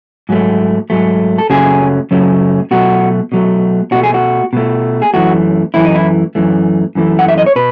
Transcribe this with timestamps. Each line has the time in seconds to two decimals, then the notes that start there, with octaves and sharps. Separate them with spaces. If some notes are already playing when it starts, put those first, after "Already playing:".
0.29 G#2 F#3 A3
0.90 G#2 F#3 A3
1.38 A4
1.50 F#2 C#3 F#3 A3 G#4
2.11 F#2 C#3 F#3 A3
2.71 B2 F#3 A3 F#4
3.32 B2 F#3 A3
3.92 B2 A3 F#4
4.04 G#4
4.14 F#4
4.53 B2 A3
5.02 G#4
5.14 F#2 E3 A3 F#4
5.74 F#2 E3 A3 E4
5.85 D#4
5.95 E4
6.35 F#2 E3 A3
6.95 F#2 E3 A3
7.19 F#5
7.28 E5
7.38 D#5
7.46 C#5
7.56 B2 B4